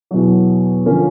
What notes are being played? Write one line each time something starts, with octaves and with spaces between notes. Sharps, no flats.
E2 B2 F#3
D3 F3 A#3 C#4